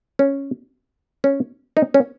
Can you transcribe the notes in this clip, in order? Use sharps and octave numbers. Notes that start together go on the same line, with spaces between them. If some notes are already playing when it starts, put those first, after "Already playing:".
C#4
C#4
D#4
C#4